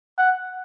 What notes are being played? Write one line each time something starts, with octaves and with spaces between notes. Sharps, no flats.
F#5